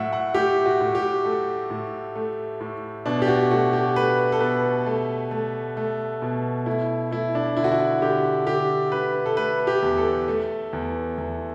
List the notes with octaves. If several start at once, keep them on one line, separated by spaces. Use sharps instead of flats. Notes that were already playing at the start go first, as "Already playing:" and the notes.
Already playing: A2 F#3 E5 F#5
F#5
A2 G4
F#4
A2
G4
A3
A2
A3
A2
B2 D4
G4
F#4
A3 F#4
G4
A3 B4
A4
B2 B4
A3
A3
A3
B2
A3 E4
A3 E4
D4
D3 E4
F#4
E4
F#4
D3 G4
D3 G4
D3 B4
A4
A3 B4
G4
E2
A4
A3
E2
E2